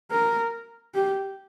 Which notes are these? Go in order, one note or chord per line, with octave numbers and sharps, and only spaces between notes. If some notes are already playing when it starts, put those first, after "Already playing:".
A#4
G4